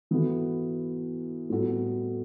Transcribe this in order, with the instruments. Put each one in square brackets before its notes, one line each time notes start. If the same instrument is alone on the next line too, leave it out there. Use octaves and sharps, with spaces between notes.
[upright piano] E3 B3 F#4 A4
A2 G3 B3 F#4 A4